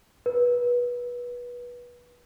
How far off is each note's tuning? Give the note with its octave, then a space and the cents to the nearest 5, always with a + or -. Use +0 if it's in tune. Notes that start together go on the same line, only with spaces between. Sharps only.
B4 -25